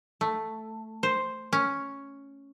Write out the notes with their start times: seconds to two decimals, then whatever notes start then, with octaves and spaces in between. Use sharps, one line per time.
0.21 A3
1.03 C5
1.53 C#4